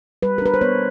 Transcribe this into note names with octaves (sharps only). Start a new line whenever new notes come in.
G3 B4
A#4
D4 B4
C5
B3 C#5